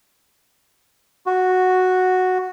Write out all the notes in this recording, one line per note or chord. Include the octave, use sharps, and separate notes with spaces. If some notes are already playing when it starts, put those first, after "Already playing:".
F#4